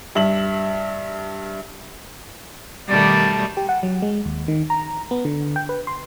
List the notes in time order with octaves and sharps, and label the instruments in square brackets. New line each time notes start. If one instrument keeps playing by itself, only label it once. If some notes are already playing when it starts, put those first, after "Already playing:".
[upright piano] G2 E5 F#7
[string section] B2 D#3 [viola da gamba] G3 [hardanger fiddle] A3 [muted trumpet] D5
[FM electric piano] G4
F#5
F#3
G#3
D#2
D#3
A#5
B3
D3
G5
B4
C6